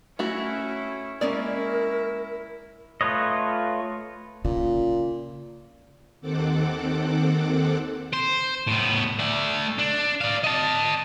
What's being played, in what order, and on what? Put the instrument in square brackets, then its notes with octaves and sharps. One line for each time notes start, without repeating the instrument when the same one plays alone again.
[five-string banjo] A3 F#4 [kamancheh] C#4 E4
[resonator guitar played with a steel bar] G#3 A#3 C#4 [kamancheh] E4 [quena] A#4 [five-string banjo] D5
[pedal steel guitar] A3 F4 B4 C#5 D#5
[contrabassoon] A#2 [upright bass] C#3
[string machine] D#2 D#3 C4 A4 F#5 D6
[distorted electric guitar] C5
A2 B3
A3 D5
D4
D5 F5
D#5 A5